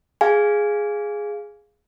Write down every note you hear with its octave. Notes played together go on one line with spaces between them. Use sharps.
G#4 F5 G#5